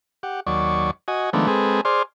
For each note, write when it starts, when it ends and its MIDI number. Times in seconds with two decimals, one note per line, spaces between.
0.23 0.40 67
0.23 0.40 78
0.47 0.91 39
0.47 0.91 54
0.47 0.91 74
0.47 0.91 85
1.08 1.30 66
1.08 1.30 75
1.08 1.30 80
1.33 1.47 51
1.33 1.47 53
1.33 1.47 56
1.33 1.47 57
1.33 1.47 59
1.33 1.47 62
1.47 1.81 56
1.47 1.81 60
1.47 1.81 68
1.47 1.81 69
1.47 1.81 71
1.85 2.03 68
1.85 2.03 72
1.85 2.03 74
1.85 2.03 84
1.85 2.03 89